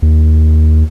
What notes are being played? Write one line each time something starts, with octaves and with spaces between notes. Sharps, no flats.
D#2